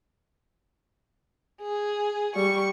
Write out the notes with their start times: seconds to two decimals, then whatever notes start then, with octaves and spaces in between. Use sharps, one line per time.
1.61 G#4
2.36 G3 C#6